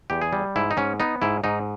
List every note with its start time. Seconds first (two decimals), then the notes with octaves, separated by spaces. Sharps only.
0.10 E2 G4
0.21 G#4
0.33 G3
0.56 G#2 E4
0.71 D#4
0.77 G#2 C#4
1.00 B3 D#4
1.22 G#2 E4
1.44 G#2 D#4